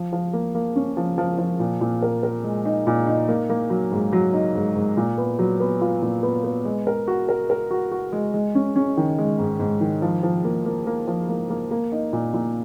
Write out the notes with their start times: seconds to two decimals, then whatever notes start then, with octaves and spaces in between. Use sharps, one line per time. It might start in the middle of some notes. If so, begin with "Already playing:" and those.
Already playing: F3
0.13 F3
0.33 A#3
0.55 A#3
0.76 C#4
0.97 F3
1.18 F3
1.39 F3
1.60 A#2
1.81 A#2
2.02 A#4
2.23 A#4
2.44 G#3
2.65 D#4
2.87 A#2
3.07 D#4
3.28 A#3
3.50 A#3
3.70 F#3
3.92 G#2
4.13 F#3
4.34 D#4
4.55 G#2
4.76 G#2
4.97 A#2
5.18 B3
5.39 F#3
5.60 B3
5.81 F4
6.02 A#2
6.23 B3
6.44 B3
6.65 G#3
6.87 A#4
7.08 F#4
7.29 A#4
7.50 A#4
7.71 F#4
7.92 F#4
8.13 G#3
8.34 G#3
8.55 C#4
8.76 C#4
8.97 D#3
9.18 G#3
9.39 G#2
9.60 G#2
9.81 D#3
10.02 F3
10.23 F3
10.44 A#3
10.66 A#3
10.87 A#3
11.07 F3
11.29 A#3
11.50 A#3
11.71 A#3
11.92 D#4
12.13 A#2
12.34 A#2